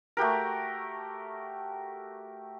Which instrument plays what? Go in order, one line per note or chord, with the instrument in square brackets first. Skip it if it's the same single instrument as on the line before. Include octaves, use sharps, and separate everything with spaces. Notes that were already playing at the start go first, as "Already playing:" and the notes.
[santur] A3 F#4 G4 A#4